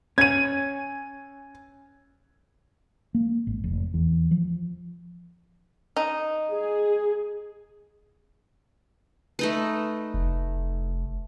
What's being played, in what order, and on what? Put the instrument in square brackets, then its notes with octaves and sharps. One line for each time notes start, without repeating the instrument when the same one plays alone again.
[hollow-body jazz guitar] C#4 [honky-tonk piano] G#6 D#7
[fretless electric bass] A#3
G#1
F1
E2
F3
[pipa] D#4
[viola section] G#4
[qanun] A3 D#4 B4
[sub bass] F1